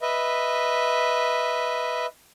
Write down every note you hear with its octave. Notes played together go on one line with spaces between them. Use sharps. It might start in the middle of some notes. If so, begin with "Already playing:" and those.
B4 D#5 E5